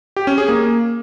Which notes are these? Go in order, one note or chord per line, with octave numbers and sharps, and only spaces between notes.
G4
C#4
G#4
A#3